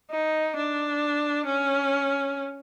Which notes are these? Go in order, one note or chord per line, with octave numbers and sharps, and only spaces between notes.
D#4
D4
C#4